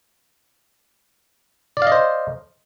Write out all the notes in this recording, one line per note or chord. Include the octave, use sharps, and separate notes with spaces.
C5 D5 D#5 F5